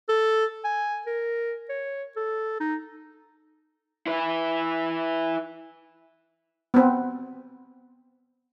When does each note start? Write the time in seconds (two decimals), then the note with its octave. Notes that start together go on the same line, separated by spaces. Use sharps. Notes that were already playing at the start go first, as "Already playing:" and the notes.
0.09 A4
0.64 G#5
1.06 A#4
1.69 C#5
2.16 A4
2.60 D#4
4.06 E4 B4
6.74 B3 C4